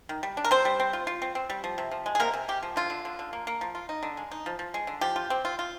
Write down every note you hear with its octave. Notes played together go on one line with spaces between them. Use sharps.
D#3
G3
D4
A#4
G3 C4 C5
G3
C4
F4
F4
C4
C4
G3
F3
C3
F3
G#3
G#4
C3 A#3 A#4
C3
C3 G4
F3
D3 F4
D3
D3
D3
A#3
A#3
F3
F4
D#4
D3
G#3
D#4
F3
F3
G#3
D3
F3 G4
F4
C4
F4
F4